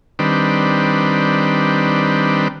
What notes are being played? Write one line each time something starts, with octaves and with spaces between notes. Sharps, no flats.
D#3 G3 C4 D4 B4